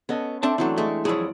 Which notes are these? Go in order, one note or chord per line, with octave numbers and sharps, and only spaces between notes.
B3 C#4 A4 D#5
C4 D4 A4 E5 A5
E3 F#3 A3 C4 D4
G#3 A3
F2 F#3 E4 G#4 D5